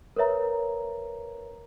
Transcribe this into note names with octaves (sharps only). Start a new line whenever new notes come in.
A#4 B4 C#5 E5 A#5